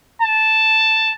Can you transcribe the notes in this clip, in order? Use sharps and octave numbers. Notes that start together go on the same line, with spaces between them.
A5